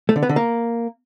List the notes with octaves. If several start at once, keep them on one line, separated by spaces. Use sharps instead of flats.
A3
D3
B3
D3
A#3